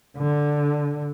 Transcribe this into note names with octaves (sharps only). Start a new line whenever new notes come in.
D3